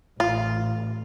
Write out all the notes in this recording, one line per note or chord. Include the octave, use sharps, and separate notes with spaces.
A1 F4